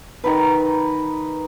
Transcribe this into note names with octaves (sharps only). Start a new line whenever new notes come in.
D#3 D#4 B4